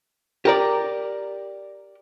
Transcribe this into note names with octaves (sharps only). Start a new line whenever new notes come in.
G4 A#4 D5